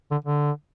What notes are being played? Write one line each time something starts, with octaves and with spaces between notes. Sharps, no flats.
D3
D3